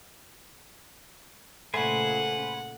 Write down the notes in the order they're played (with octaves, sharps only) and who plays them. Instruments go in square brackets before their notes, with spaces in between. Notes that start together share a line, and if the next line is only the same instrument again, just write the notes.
[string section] A#2 C#3 [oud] A3 [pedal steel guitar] B4 C5 G#5 [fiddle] F#5